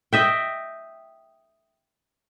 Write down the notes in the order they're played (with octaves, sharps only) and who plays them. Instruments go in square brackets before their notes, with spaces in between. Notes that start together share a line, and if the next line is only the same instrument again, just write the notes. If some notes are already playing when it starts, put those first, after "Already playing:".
[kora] D#5 E5 G5